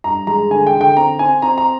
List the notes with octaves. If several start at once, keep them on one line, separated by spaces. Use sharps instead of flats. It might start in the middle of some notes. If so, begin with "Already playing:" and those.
G2 A#5
G#3 A#5
D3 G#5
G5
D3
G5
C4 A#5
C4 G#5
C4 A#5
A#5